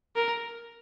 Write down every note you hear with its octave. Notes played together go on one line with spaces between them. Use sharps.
A#4